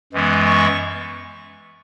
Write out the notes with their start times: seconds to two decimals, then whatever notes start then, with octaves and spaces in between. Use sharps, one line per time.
0.13 F#2 E3 G#3 B3
0.47 C#6